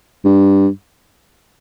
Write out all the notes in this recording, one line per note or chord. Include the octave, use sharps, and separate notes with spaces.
G2